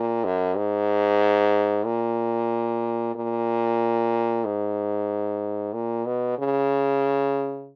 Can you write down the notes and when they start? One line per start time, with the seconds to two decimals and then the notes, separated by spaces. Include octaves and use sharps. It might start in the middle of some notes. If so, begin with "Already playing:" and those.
Already playing: A#2
0.25 F#2
0.57 G#2
1.86 A#2
3.15 A#2
4.45 G#2
5.73 A#2
6.06 B2
6.39 C#3